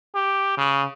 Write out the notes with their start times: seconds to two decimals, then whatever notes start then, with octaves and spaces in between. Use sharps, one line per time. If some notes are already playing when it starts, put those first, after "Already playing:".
0.15 G4
0.58 C#3